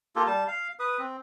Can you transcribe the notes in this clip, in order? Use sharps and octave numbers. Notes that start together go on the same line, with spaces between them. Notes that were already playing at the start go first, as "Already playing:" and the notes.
A#3 F4 G4 A4
G3 A5
F5
B4 D#6
C4